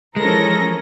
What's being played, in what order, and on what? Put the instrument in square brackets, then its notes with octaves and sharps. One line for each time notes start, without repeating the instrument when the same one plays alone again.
[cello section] E3 F3 C#4 [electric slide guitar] G#3 [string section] A4 A#4 A#6